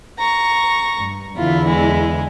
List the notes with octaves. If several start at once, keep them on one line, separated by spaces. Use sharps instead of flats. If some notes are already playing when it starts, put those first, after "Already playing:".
A#5 C#6
G2
E2 D3 E4 F4
G#3